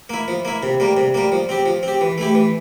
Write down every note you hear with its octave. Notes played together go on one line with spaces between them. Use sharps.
A#3 E4
F3
A#3 E4
C3
G3 A#3
C3
G3 A#3
F3
C4 G4
F3
C4 G4
E3
A3 E4 G4
E3